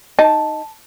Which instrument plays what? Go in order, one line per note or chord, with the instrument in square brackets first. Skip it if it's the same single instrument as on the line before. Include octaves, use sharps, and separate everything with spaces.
[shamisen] D#4 [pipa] A5